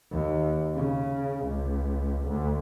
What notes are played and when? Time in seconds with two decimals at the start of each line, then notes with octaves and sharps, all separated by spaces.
0.11 D#2
0.76 C#3
1.46 C#2
2.28 D2